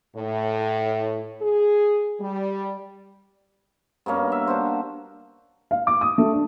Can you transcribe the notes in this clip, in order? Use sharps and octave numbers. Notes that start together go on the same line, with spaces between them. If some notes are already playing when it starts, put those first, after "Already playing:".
A2
G#4
G3
G2 B2 A#3 C#4
E5
D4 F#4 C5
F5
D6
D#6
A3
D4